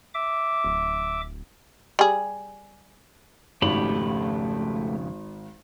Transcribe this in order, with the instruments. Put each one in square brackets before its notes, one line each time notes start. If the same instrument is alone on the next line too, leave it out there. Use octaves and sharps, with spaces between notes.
[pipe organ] E5 D6
[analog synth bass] D1
[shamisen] G3 G#4
[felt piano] G#1 [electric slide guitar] F2 C#3 [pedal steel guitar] A3 G4 B5